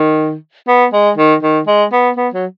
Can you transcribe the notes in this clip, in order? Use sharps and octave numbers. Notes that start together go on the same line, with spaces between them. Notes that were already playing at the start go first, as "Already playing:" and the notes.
Already playing: D#3
B3
G#3
D#3
D#3
G#3
B3
B3
F#3